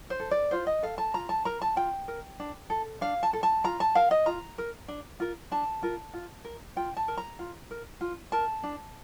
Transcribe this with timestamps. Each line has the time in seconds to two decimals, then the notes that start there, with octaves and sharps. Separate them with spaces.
0.10 C5
0.20 A4
0.31 D5
0.51 F4 C5
0.67 D#5
0.83 A4 F5
0.98 A5
1.14 F4 A#5
1.29 A5
1.45 A#4 A#5
1.62 A5
1.76 F4 G5
2.08 A#4
2.40 D4
2.70 A4
3.01 D4 F5
3.23 A5
3.33 A4
3.43 A5
3.64 F4 A#5
3.80 A5
3.95 A#4 F5
4.11 D#5
4.26 F4 A#5
4.58 A#4
4.88 D4
5.20 F4 A#4
5.51 D4 A5
5.83 F4 A#4
6.14 F4
6.45 A#4
6.76 F4 G5
6.97 A5
7.08 A#4
7.18 A#5
7.39 F4
7.71 A#4
8.01 F4
8.32 A#4 A5
8.63 D4